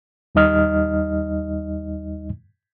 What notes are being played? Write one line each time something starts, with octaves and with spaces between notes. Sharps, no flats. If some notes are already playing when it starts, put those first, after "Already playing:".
D#2 G3 D#4 D#5 F6